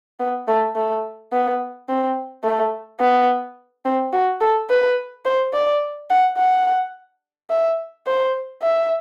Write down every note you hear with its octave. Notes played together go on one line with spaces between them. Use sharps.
B3
A3
A3
B3
C4
A3
B3
C4
F#4
A4
B4
C5
D5
F#5
F#5
E5
C5
E5